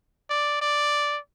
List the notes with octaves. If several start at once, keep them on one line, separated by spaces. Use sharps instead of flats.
D5
D5